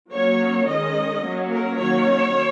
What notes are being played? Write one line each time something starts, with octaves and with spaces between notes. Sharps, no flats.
F#3 A#3 C#4 C#5
D#3 G#3 C#4 D#5
F#3 A#3 C#4
A#4
D#3 F#3 A#3 C#4 C#5